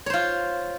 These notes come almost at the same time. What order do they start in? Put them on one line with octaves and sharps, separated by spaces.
C#5 C5 F4